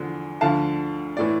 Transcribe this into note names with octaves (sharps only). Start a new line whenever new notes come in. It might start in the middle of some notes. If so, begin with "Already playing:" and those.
Already playing: E2 D3 F3
D2 D3 F3 F5 A5
A2 E3 D5